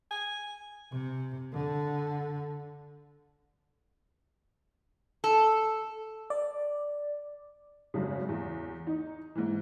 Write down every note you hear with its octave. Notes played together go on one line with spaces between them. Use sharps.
G#5
C3
D3
A4
D5
G#1 F#2 C#3
E2
D#4
G#2 E3